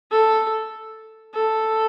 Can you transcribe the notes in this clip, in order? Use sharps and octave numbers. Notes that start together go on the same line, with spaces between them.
A4
A4